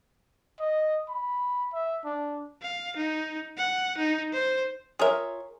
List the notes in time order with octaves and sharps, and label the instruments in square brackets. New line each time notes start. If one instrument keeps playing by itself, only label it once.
[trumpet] D#5
B5
E5
D4
[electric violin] F5
D#4
F#5
D#4
C5
[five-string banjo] F4 C#5 E5 [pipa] G#4 A#4